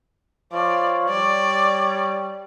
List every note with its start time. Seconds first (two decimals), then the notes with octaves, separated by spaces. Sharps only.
0.53 F3 C#5 D5
1.09 G3 D5